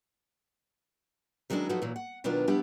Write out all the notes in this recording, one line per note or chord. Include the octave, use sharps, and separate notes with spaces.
D#3 F#3 G#3 C#4 D4 E4
F3 F#3 A3 B3 D#4 F#4
A#2 E3 F#3
F#5
B2 D#3 F#3 B3 D4 F4
F3 G3 B3 D4 E4 G4